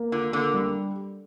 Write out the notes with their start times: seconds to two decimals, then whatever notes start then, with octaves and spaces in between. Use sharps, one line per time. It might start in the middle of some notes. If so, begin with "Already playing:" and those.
Already playing: A#3
0.12 D3 F4
0.33 D3 A#3
0.54 G3